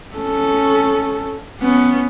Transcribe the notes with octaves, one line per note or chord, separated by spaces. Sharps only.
C#4 A4
B3 C#4